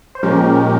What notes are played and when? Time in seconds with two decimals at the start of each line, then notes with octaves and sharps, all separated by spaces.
0.15 C5
0.23 A#2 F3 G#3 C#4 G4 A#4